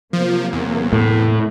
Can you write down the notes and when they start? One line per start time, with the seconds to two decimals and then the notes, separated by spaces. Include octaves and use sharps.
0.13 C3 F3 F#3 A#3
0.53 E2
0.93 A2